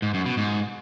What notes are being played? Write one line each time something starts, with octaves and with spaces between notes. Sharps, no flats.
G#2
F#2
B2
G#2